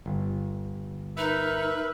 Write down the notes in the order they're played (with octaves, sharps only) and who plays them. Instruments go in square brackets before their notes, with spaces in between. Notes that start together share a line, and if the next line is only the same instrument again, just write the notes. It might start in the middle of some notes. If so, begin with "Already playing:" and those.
[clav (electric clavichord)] G1
[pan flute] D#4 [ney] A#4 [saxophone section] B4 E5